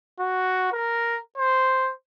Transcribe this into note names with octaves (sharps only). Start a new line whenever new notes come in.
F#4
A#4
C5